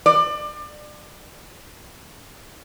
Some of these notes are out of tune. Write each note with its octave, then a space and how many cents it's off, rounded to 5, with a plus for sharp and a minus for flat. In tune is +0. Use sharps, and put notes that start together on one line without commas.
D5 +30